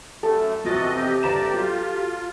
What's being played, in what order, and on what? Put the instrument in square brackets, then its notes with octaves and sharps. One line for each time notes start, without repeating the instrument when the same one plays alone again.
[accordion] F#2 A3 [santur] A4
[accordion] C3 E3 D#5 [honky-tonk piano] F3 A6 [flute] F#4
[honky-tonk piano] C4 [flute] G4
[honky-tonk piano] G1 A#5 E7 [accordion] C3 D5
[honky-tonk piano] F#3 [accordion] F4